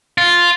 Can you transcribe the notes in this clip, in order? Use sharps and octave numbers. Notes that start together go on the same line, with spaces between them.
F4